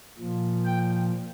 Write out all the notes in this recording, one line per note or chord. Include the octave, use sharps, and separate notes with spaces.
A#2 F3
G5